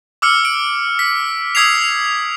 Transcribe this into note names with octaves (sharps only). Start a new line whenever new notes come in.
D6 E6 F6 C#7
D7
B6
D#6 E6 G#6 B6 C7 F7